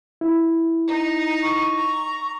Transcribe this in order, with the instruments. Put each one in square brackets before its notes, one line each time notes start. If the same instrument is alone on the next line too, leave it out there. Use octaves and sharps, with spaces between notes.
[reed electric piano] E4
[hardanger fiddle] D#4
[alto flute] C#6
[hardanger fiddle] A#5